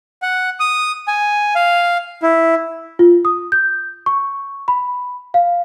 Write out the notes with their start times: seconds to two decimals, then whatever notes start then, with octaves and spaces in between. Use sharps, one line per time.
0.22 F#5
0.60 D#6
1.08 G#5
1.55 F5
2.23 E4
2.99 F4
3.25 D#6
3.52 G6
4.06 C#6
4.68 B5
5.34 F5